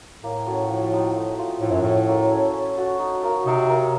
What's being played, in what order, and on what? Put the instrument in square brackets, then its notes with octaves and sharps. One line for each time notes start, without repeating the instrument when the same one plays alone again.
[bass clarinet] A2 [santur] A#3
[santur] C#4 F#4 A4
F3
C4 D#4 F#4
A3
C4 F4
[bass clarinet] A2 [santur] F3
[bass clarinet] F#2
[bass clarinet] A2 [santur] A3 C#4 F#4
[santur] A#3
C#4 A4 C#5
C#4
F#4 A4
D#4
F#4 A#4 F5
[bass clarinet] C3 [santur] D#4
[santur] A#4 F5